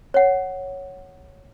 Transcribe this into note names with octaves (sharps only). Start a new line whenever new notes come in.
C#5 F#5